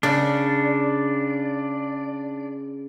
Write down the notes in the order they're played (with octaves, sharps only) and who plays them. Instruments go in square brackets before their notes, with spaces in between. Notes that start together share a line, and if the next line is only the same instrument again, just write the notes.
[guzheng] C#3 [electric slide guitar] D4 D5